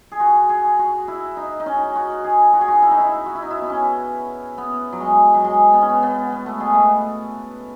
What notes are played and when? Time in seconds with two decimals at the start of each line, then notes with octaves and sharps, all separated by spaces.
0.12 G#4
0.20 F#4
0.49 G#4
0.79 F#4
1.08 E4
1.37 D#4
1.60 D#4
1.66 C#4
1.96 F#4
2.24 G#4
2.53 F#4
2.61 G#4
2.68 F#4
2.82 E4
2.91 D#4
3.00 E4
3.26 F#4
3.35 E4
3.42 D#4
3.50 E4
3.61 B3
3.70 C#4
4.58 B3
4.92 F#3
5.00 G#3
5.34 F#3
5.44 G#3
5.73 B3
5.81 C#4
5.89 B3
6.03 B3
6.32 B3
6.46 A3
6.60 G#3
6.73 A3